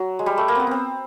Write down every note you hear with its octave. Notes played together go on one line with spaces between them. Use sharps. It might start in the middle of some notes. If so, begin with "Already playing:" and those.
Already playing: F#3
G#3
G3
A3
A#3
B3 C4
B3 C4